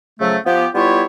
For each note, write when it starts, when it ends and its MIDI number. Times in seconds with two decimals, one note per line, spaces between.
0.20 0.36 49
0.20 0.36 53
0.20 0.36 54
0.20 0.36 57
0.45 0.67 53
0.45 0.67 59
0.45 0.67 67
0.74 1.04 55
0.74 1.04 59
0.74 1.04 64
0.74 1.04 65
0.74 1.04 67
0.74 1.04 73